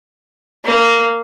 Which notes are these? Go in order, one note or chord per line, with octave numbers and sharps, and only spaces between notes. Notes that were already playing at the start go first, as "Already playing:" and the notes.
A#3